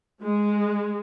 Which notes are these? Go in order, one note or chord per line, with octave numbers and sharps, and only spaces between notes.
G#3